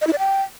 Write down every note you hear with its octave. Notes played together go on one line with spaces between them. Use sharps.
D#5
E4
D5
G5